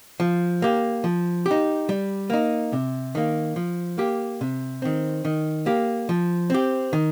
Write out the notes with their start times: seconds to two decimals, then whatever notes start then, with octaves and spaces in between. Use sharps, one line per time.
0.20 F3
0.62 A#3 G4
1.04 F3
1.46 G4
1.51 D#4
1.89 G3
2.30 A#3 D#4
2.73 C3
3.15 D#3 A#3
3.56 F3
3.98 A#3 G4
4.41 C3
4.82 D#3 C4
5.25 D#3
5.66 A#3 G4
6.09 F3
6.50 C4 G4
6.93 D#3